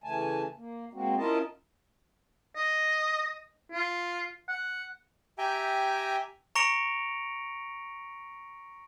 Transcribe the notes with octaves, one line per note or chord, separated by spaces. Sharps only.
C#3 E3 A3 G#5 A5
A#3
G#3 A#3 C4 F#4
C#4 E4 F4 A#4 D#5 A5
D#5
F4
F#5
G4 E5 G5 G#5 A#5
A#5 C#6 A#6 C#7 D7 F7